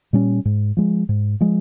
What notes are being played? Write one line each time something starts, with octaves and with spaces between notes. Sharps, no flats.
A#2 G3 C#4
G#2
F3 G#3
G#2
F3 G#3